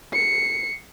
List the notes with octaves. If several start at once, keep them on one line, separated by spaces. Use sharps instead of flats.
C7 C#7